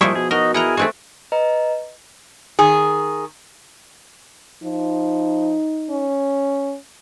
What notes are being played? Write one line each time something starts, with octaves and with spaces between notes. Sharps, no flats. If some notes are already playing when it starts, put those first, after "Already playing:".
A#2 F3 G3 D#4 E4 G#4 C#6
B2 G#4
D#4 F#4 A#4 D#5
E4 G#4 A#4 F#5 G5 A#5
G2 E3 G#3 A3 C4 F#4
B4 D#5 A#5
D#3 G#4
F3 D#4
C#4